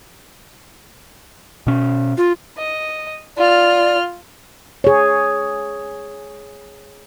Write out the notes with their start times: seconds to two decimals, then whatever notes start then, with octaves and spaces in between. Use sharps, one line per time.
1.67 B2 C#4
2.17 F4
2.57 D#5
3.37 F4 D5 F6
4.84 G#4 C#5